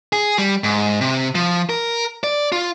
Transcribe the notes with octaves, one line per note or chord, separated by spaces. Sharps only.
G#4
G3
G#2
C3
F3
A#4
D5
F4